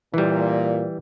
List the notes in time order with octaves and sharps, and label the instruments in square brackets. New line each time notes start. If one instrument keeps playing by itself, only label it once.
[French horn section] A#2 [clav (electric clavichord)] E3 G3